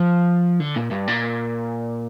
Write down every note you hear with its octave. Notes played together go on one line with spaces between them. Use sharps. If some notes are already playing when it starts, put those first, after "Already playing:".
Already playing: F3
D3
A#2
G2
A#2